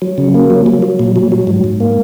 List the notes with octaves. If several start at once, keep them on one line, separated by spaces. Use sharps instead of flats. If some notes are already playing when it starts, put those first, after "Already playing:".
F#3
C#3
A#3
F#3
F#3
F#3
A#2
F#3
F#3
G#2
G#2
A#3